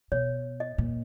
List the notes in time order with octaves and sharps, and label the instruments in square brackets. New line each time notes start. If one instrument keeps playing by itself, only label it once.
[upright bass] B2 [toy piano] C#5
[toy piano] D#5
[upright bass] A#2